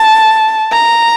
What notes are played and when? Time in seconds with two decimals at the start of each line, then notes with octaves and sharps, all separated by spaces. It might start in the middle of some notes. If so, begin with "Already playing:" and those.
Already playing: A5
0.72 A#5